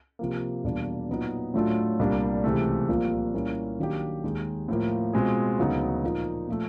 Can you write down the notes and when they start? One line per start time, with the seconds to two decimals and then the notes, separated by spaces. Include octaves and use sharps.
0.19 C3 F3 A#3
0.64 E2 B2 G3 A#3 D4
1.09 A#2 F#3 B3 D#4
1.54 A2 F#3 A3 D4 F4
1.99 C2 A#2 G3 A#3 D4
2.44 C#2 C3 E3 A3
2.88 C2 A#2 F3 A#3
3.34 A#2 G3 A#3 C#4 E4
3.79 D#3 F#3 A#3 D4 G4
4.23 D#2 D#3 G#3
4.69 A2 F3 A#3
5.13 B2 G#3 C4 F4 G#4
5.58 D2 C#3 F#3 B3 D#4
6.04 A#2 F3 A#3 D#4
6.48 A#2 F3 A3